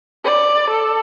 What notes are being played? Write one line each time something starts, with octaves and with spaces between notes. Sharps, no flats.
D5
A4